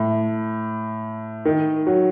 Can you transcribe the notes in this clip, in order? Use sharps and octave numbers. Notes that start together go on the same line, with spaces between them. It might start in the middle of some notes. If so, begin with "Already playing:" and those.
Already playing: A2
D#3
F#3